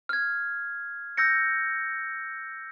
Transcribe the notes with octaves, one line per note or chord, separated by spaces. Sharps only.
F6 G#6
E6 G6 A#6 C#7